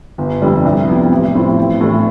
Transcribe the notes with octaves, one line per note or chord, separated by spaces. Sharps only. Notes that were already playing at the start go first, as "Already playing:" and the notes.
G1
F2 D3 G3 D4
C2
C3 F3 B3 E4
A1
A2 F3 C4 E4
A1
A2 E3 A3 D4